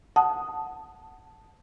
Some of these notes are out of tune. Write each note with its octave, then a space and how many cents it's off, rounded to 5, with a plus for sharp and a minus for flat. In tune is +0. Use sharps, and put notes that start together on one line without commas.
F#5 +0 A5 +0 D#6 +0